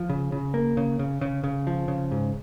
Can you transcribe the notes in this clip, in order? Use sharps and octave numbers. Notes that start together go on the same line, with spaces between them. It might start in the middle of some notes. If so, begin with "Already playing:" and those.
Already playing: F3
C#3
C#3
A#3
C#3
C#3
C#3
C#3
F3
C#3
G#2